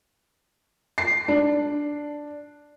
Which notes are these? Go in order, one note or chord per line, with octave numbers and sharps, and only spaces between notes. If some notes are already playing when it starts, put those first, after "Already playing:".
C7
D4